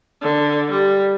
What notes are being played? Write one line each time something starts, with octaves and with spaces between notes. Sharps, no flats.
D3
G3